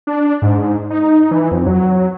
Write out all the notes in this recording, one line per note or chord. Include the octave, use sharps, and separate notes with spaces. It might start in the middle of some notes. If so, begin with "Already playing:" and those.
D4
G#2
D#4
E3
F2
F#3